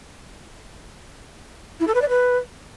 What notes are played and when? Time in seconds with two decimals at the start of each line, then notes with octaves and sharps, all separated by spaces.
1.80 E4
1.87 A4
1.95 B4
2.02 D5
2.09 B4